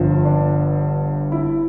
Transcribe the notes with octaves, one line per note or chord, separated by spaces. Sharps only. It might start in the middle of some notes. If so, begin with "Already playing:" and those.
Already playing: G1 G2 D3 F3
D4
E4